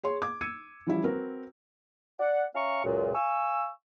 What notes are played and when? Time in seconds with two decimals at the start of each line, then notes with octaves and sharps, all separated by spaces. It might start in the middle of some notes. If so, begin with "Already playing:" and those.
0.03 G#4 C#5 C6
0.22 D6 G#6
0.41 E6 G#6 C#7 D#7
0.87 E3 F3 G3 C#4 E4
1.04 C4 F#4 A#4 B4
2.20 D5 F#5
2.55 C#4 E5 F5 G#5 A#5 C#6
2.84 C#2 F#2 A#2
3.14 F5 G#5 C#6 E6